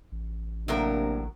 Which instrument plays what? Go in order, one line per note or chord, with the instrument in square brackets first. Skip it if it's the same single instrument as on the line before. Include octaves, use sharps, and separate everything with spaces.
[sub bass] A1
[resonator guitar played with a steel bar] A2 F#3 A#4 [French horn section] C3 A#3 D4